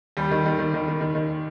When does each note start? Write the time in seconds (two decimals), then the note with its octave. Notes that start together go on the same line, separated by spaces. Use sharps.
0.17 D#2 G3
0.31 D#3
0.46 D#3
0.59 D#3
0.74 D#3
0.88 D#3
1.01 D#3
1.15 D#3